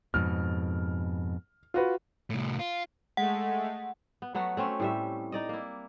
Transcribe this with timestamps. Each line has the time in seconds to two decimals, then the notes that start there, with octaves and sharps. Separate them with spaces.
0.14 F2 G#2 B2 F6
1.74 F4 F#4 B4
2.30 C2 A2
2.59 F4
3.17 G#3 A3 F#5
4.22 B3
4.35 F#3 A3 B3 F#4
4.57 A3 C4 C#4
4.80 A2 G3 E5
5.32 D#4 D5 D#5
5.49 A#3 E4